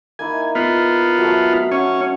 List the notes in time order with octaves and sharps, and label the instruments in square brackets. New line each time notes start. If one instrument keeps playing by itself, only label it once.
[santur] A#3 D#4 E4 [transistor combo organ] G#5
[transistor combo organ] B3 F4
[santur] F#3 A3
[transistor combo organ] C#4 [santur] F#5